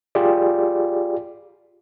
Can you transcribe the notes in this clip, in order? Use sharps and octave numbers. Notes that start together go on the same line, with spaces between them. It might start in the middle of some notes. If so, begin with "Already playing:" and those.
F4 G4 G#4 D5